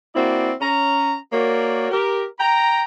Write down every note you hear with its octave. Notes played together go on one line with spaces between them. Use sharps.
A#3 C4 E4 F#4 D5
C#4 A#5
A#3 F#4 A#4 C#5 D5
G4 A#4
G5 A#5